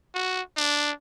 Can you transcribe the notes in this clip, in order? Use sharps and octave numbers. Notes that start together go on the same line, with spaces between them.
F#4
D4